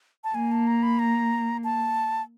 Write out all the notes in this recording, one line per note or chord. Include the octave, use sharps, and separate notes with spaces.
A5
A#3 G#5
A5
A#5
B5
A#5
A5